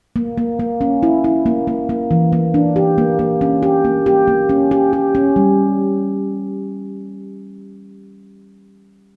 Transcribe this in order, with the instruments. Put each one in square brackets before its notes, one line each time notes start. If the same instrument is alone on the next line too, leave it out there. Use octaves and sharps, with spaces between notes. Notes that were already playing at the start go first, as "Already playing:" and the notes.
[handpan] A#3
A#3
A#3
C#4
E4
E4
A#3
A#3
A#3
E3
A#3
D4
G4
A#3
A#3
C#4
G4
A#3
G4
A#3
C#4
G4
G4
C#4
G3